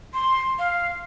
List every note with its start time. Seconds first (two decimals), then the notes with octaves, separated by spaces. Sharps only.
0.14 C6
0.59 F5